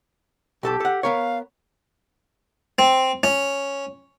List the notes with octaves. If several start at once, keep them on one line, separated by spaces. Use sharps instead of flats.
B1 G4 A4 A5
A4 F#5
B3 A#4 C#5 F5
C4
C#4